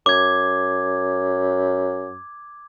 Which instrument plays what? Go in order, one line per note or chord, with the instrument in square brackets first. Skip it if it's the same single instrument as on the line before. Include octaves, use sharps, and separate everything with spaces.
[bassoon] F#2 [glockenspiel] D6 G#6